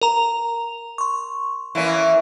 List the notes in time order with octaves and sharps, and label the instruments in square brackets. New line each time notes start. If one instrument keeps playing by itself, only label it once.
[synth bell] A#4 A#5 F7
C6 C#6
[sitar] E3 A#3 C#4